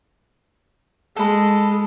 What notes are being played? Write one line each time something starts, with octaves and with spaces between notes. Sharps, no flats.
G#3 A4 B5